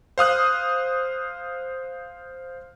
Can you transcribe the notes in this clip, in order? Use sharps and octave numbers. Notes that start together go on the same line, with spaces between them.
C5 F5 D#6 F#6